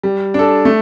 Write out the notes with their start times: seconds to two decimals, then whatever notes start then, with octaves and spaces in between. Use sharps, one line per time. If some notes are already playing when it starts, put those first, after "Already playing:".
0.03 G3
0.34 D4 A4
0.65 A3